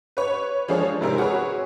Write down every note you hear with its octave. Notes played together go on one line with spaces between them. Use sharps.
B4 C#5
F3 G#3 D4 G#4 A4 C#5
G#2 C3 E4 A#4
F#4 G#4 B4 C#5